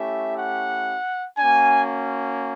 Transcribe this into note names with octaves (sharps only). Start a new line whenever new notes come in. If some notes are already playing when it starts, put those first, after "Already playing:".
Already playing: A3 C#4 E4 G4 E5
F#5
A#3 C#4 F#4 G#5